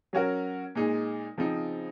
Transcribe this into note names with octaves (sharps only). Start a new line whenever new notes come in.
F#3 C#4 F#4 A#4
A#2 G#3 D#4 G#4
C#3 F3 C4 D#4